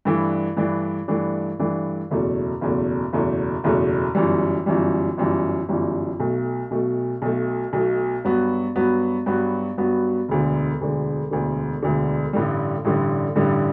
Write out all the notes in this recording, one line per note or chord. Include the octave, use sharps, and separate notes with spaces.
G2 E3 A3 D4
G2 E3 A3 D4
G2 E3 A3 D4
G2 E3 A3 D4
F#1 E2 B2 A3
F#1 E2 B2 A3
F#1 E2 B2 A3
F#1 E2 B2 A3
G1 F#2 E3 G3
G1 F#2 E3 G3
G1 F#2 E3 G3
G1 F#2 E3 G3
B1 B2 A3
B1 B2 A3
B1 B2 A3
B1 B2 A3
G2 F#3 B3 F#4
G2 F#3 B3 F#4
G2 F#3 B3 F#4
G2 F#3 B3 F#4
E1 D2 D3
E1 D2 D3
E1 D2 D3
E1 D2 D3
A1 G2 D3 G3
A1 G2 D3 G3
A1 G2 D3 G3